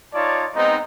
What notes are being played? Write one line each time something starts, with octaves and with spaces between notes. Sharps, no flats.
D#4 F4 C#5 D5 A5
G#3 B3 C4 D#4